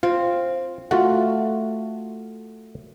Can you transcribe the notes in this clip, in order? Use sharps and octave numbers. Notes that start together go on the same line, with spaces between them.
C4 F4
A3 F4 F#4 F#5